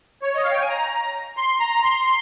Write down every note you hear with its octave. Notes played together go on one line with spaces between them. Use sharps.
C#5
D#5
F5
G5
G#5
A#5
C6
A#5
C6
C6